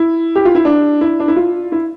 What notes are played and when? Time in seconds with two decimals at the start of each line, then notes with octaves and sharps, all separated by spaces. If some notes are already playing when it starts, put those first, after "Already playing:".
Already playing: E4
0.35 G4
0.45 F4
0.55 E4
0.65 D4
1.01 E4
1.20 D4
1.28 E4
1.36 F4
1.72 E4